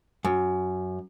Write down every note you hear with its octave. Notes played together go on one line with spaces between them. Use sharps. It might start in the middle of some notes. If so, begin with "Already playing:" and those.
F#2